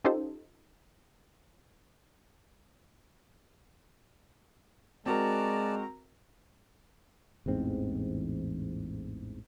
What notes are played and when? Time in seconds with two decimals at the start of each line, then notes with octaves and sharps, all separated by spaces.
0.04 C#4 D#4 F4 G4 A4 C5
5.06 G#3 C4 F#4 A#4 D5 A5 A#5
7.46 A1 E2 G#2 C4